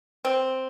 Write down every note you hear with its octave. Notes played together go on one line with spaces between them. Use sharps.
C4